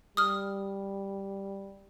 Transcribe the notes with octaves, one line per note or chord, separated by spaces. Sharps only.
G3 D#6 F6